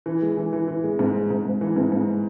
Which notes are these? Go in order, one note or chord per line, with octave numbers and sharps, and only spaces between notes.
E3
G#3
E3
E3
E3
G#3
G#2
G#3
G#2
G#2
E3
G#2
G#2